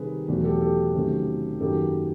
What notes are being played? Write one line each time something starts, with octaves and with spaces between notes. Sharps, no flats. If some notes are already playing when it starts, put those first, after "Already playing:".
Already playing: C3 D#3 G3 G#4 A#4 B4
E2 B2 F#3 A3 C4
G4 A4
G4 A4
C3 D#3 F#3 A3 C#4
F#2 D#3 F#3 A#3 C#4 G4 A4